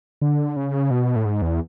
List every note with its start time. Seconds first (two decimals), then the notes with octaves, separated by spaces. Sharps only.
0.21 D3
0.56 C#3
0.91 B2
1.16 A2
1.25 G#2
1.42 E2